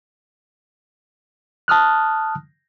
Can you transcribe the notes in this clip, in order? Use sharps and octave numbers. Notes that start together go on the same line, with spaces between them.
A5 D#6 F6 F#6